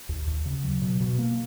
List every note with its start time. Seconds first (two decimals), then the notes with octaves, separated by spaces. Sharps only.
0.09 D#2
0.27 D#2
0.46 C#3
0.63 F#3
0.82 B2
1.01 B2
1.19 A#3